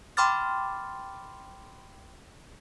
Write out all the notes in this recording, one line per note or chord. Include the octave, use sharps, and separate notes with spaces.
G5 B5 C6 D6 F6 A6